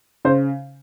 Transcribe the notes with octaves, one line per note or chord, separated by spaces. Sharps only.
C#3 C5